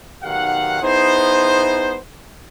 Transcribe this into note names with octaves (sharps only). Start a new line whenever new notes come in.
B1 D#3 G4 F5 F#5
B3 D#4 E4 G#4 C5